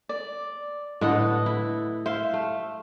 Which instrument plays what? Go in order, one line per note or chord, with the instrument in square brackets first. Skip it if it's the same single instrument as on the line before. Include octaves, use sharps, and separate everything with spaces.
[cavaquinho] D5
[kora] A2 D3 A4 [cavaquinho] B4 D#5
[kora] E4
[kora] C5 [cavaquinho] E5 F5
[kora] A3